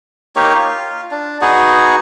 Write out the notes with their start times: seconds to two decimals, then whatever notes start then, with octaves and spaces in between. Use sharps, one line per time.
0.36 A#3 D#4 G4 C#5
0.55 F4
1.11 D4
1.41 B3 D#4 F#4 G#4